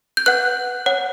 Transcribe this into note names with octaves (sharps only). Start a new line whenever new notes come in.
G6
B4 F#5 F#6
C#5 F#5